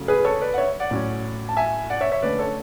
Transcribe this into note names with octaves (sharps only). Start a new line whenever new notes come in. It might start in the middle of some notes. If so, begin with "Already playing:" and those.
Already playing: C#3 F#3 A3
G#4 B4
A4 C#5
B4 D5
F#5
C#5 E5
D5 F#5
A2 F#3 C#4
A5
E5 G#5
D5 F#5
C#5 E5
C#5 E5
D3 A3 C#4 B4 D5
A4 C#5